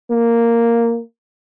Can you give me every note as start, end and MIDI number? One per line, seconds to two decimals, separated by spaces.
0.11 1.01 58